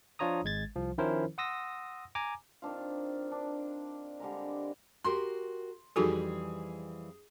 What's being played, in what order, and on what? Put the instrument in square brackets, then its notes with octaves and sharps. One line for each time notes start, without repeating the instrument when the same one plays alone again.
[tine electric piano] F3 D4 F4 C#5 A#5 D#6
G#1 G#3 G#6 A6
C2 F3
D#3 F3 C#4 E4 A#4 C5
F#5 C6 D#6 E6 A#6
G#5 A#5 D6
[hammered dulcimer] D#3 C4 D4 F4
D4
D3 G3 G#3 A#4
[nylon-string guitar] F#4 G4 A#4 [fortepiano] C6
[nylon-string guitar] F2 E3 G3 [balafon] D#4 F#4 A4 [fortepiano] G#4